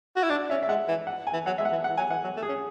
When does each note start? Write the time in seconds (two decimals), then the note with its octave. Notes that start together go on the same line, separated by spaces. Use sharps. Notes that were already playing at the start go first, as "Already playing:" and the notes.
0.16 F#4
0.23 E4
0.30 D4 D5
0.50 C#4 E5
0.63 E5
0.68 G#3 F#5
0.88 E3
1.07 F#5
1.27 G#5
1.33 E3
1.46 F#3 F#5
1.58 G#3 E5
1.65 F#5
1.72 E3
1.84 E3 F#5
1.97 F#3 G#5
2.10 E3 F#5
2.24 F#3
2.37 A3
2.43 G#4
2.49 C#4